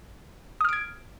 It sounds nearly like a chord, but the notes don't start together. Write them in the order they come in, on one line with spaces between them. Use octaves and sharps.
D#6 F6 D7 G#6